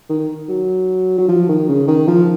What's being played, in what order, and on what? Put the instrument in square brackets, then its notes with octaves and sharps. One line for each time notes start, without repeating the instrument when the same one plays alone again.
[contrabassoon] D#3
F#3
F#3
F3
D#3
C#3
D#3
F3